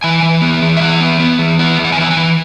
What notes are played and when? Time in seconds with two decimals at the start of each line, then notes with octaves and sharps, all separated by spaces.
0.03 E3 G#5
0.23 E3
0.41 B3
0.62 E3
0.77 E5
0.80 E3 F#5
1.01 B3
1.20 B3
1.39 E3
1.59 B3 F#5
1.79 E3
1.85 F#5
1.92 G#5
1.97 E3 F#5
2.11 G#5
2.17 E3